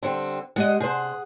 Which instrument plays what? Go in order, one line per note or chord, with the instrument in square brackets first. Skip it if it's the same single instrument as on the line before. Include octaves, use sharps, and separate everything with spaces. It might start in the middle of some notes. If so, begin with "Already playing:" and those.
[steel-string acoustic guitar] D3 G3 C4
[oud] G#3 G4 D#5 [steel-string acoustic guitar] F#5
[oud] C3 C5 [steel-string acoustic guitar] G#4 F#5